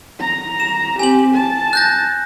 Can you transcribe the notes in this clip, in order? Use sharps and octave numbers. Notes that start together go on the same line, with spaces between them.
A#5
E7
C4 G4 G#5 F#7
A5
F#6 G6 A#6